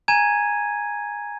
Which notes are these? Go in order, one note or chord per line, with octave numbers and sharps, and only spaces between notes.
G#5 A#5 G#6 D#7